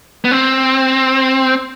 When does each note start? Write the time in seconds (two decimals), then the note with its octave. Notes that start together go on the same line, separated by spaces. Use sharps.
0.25 B3
0.31 C4